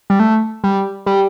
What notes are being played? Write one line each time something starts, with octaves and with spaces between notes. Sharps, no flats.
G3
A3
G3
G3